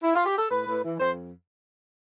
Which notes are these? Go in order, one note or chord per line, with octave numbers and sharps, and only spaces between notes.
E4
F4
G4
A4
A2 B4
A2
E3
F2 C5